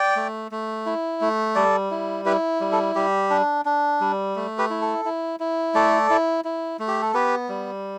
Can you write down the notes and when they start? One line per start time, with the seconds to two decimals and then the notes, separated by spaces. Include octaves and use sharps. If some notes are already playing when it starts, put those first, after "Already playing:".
Already playing: D5 G5
0.16 A3
0.52 A3
0.86 E4
1.21 A3
1.55 G3 A4 D5
1.91 E4
2.25 E4 G4 B4
2.61 G3
2.72 A4
2.95 G3 G4
3.30 D4
3.65 D4
4.00 G3
4.36 A3
4.58 G4 B4
4.70 E4
4.81 A4
5.05 E4
5.40 E4
5.75 A3 A4 D5
6.10 E4
6.45 E4
6.79 A3
6.88 G4
7.02 A4
7.14 B3 G4 B4
7.49 G3